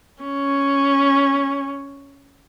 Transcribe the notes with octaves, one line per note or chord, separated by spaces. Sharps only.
C#4